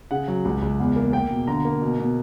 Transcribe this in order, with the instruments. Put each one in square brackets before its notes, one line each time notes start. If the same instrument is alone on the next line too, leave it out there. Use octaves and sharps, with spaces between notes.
[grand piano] C#3 F#5
F#3
C#2
C#2
E2
A#3
A#3 G5
B2
D3 A#5
A#3
B2
B2